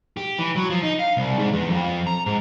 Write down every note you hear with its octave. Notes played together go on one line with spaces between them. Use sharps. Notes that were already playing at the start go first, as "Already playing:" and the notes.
G4
E3
F#3
F3
D#4
F5
C2
G#2
E2
F2
A#5
G#2